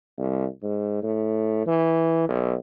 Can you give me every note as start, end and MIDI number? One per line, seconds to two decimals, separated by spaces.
0.18 0.45 36
0.63 0.99 44
1.03 1.65 45
1.66 2.27 52
2.28 2.54 35